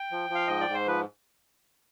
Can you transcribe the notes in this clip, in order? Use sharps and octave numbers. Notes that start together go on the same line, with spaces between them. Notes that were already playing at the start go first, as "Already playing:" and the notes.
Already playing: G5
F3
F3
F5
G#2 D#5
D5
G#2
C5
F3 B4